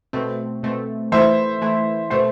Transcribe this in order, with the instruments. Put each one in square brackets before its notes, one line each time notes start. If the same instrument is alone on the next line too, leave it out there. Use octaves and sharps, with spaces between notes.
[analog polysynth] B2 A3 C4
B2 A3 C4
[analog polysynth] E3 A3 E4 [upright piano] C5 E5
[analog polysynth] E3 A3 E4
[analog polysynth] B2 A3 [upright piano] C5 E5